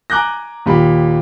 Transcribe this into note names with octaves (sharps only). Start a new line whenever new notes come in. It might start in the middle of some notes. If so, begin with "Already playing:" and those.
G#5 A#5 D6 F#6 G6 A#6
D#2 A#2 G4 B5